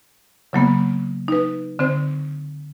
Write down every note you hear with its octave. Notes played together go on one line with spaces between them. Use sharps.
C#3 F#3 A#3 B3
D#4 B4
D3 C4 C5